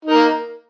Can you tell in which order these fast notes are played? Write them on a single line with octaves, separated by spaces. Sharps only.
D#4 A#4 A#3